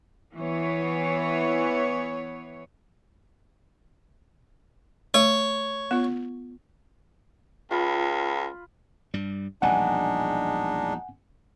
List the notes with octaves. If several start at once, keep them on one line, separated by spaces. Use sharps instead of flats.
E3 B3 C#5
A3 C#5
B3 F4
C#2 F4 B4 B5
G2 G3
E1 A#1 G3 G#3 D4 D#4 F#5 G#5